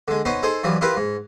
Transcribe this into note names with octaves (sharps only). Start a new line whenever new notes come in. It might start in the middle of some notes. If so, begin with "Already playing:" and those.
D3 G#3
B3 C#4 D#4 C5
D#4 G#4 A4 C5
F#2 E3 F3 G3
E4 F4 G4 A#4 B4
G#2